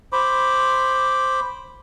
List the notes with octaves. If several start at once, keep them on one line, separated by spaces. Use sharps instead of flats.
C5 B5 D6